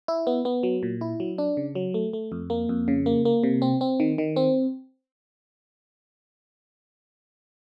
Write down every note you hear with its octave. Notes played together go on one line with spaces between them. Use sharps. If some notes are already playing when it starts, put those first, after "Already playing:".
E4
B3
B3
F#3
A#2
E4
F#3
D4
C#3
F#3
A3
A3
F2
A#3
F2
C#3
A#3
A#3
C3
C4
C4
D#3
D#3
C4